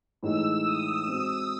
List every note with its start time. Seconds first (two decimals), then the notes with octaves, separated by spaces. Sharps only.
0.22 A2 E3 G#3 D#4 G#4 E6
0.64 D#6
1.06 G#3 C4 F#4 D#6